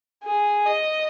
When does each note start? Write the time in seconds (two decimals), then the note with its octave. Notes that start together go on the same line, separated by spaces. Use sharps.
0.24 G#4
0.66 D#5